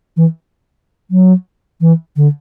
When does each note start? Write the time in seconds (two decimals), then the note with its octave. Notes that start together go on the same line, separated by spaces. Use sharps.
0.17 E3
1.11 F#3
1.81 E3
2.16 D3